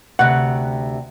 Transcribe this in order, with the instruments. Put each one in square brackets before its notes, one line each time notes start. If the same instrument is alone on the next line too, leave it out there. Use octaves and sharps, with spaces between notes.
[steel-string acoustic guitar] D2 C3 [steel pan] F#5